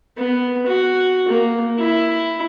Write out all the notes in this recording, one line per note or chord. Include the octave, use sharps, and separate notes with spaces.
B3
F#4
A#3
E4